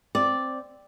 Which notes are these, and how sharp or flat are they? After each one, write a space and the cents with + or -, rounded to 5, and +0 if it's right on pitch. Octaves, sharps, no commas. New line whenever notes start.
C4 +0 D5 +0